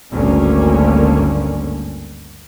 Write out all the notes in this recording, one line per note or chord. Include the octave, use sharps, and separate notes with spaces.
G#1 D2 G2 D3 A#3 C#4